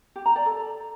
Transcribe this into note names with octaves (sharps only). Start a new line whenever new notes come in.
G4
A#5
D5
A4